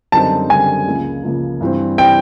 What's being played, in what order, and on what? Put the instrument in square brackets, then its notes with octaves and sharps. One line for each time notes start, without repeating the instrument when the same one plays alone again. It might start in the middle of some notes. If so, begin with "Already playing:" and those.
[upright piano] F#2 D3 G3 C4 D#4 [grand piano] A5
[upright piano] F#2 D3 G3 C4 D#4 [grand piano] G#5
[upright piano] C#2 C#3 F3 A#3
C#2 C#3 F3 A#3
G2 E3 G3 C4
[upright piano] E3 G3 C4 [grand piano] G5